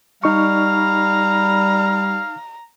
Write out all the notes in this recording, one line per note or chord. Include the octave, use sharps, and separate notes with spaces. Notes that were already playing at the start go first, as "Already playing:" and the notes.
G3 D#4 F5 A#5 C#6